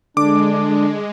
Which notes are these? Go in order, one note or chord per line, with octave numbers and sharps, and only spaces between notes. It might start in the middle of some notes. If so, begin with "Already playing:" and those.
D3 G#3 D4 D6